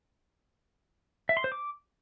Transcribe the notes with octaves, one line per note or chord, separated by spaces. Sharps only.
E5
C6
C5
D6